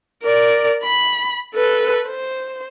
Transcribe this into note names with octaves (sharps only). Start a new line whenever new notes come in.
A#4 D5
B5
A4 B4
C5